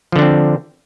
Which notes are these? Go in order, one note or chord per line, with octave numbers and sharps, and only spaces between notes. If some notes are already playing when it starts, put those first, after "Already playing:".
D3 F3 C4 D4